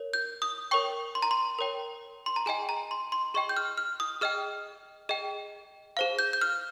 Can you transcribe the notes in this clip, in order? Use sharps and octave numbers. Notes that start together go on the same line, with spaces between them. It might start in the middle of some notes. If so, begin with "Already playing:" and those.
Already playing: A#4 C#5
G6
D#6
A#4 C#5 G5 C#6
C6
A#5
C6
A#4 C#5 G5
C6
A#5
G#4 D#5 G5 G#5
A#5
C6
C6
G#4 D#5 G5 C#6
G6
F6
F6
D#6
G#4 D#5 G5 F6
G#4 D#5 G5
G#4 C5 F5
G6
G6
F6